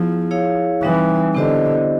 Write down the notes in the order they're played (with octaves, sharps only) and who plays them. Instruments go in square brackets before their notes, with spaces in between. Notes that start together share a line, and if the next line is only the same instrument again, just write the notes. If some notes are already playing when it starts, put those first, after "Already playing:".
Already playing: [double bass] F3 [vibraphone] B3 E4 G#4
[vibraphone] E4 G#4 C#5 F5
[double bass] E3 [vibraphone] G3 C4 D#4
[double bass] D3 [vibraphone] B3 E4 G4 C5 D#5